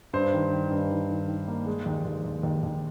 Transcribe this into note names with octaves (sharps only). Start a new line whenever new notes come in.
G2 C5
D#3
D#3
G2
D#3
D#3
D#3
A#3
G#3
D#2
D#2
D#2
D#2
D#2